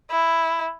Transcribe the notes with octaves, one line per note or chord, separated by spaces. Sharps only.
E4